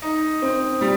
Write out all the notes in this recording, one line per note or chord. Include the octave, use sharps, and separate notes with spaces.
D#4
C4
G3